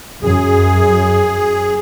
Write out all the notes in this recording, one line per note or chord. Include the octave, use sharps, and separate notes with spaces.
F#2 G#4